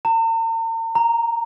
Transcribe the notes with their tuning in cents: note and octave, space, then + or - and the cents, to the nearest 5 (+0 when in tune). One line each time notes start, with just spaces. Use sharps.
A#5 -45
A#5 -5